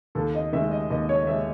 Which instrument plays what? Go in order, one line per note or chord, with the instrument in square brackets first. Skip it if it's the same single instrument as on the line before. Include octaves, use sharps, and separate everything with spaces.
[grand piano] D#2 [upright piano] A4
[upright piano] D#5
[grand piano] D#3 G#3 [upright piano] E5
[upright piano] D#5
[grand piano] D#2 [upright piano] D#5
[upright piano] C#5
[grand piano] D#3 G#3 [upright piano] E5